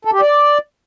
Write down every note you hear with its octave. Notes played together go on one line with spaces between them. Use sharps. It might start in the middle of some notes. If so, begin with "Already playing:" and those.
A4
G4
D5